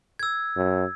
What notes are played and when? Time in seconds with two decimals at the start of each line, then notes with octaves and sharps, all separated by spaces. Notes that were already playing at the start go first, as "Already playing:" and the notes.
0.19 E6 G#6
0.56 F#2